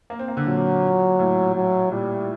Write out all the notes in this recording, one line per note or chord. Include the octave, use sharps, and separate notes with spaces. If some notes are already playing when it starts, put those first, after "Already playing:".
A#3
C4
A#3
D3
A#2 F#3
A2
F#3
A#2 G3